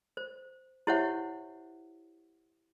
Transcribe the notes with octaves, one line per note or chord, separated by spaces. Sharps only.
C5
E4 G4 C5 C#5 E5 F#5